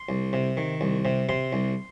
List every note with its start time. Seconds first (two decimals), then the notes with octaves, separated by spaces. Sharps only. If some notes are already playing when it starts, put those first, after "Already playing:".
Already playing: C6
0.09 C2
0.33 C3
0.57 D#3
0.81 C2
1.05 C3
1.29 C3 C6
1.53 C2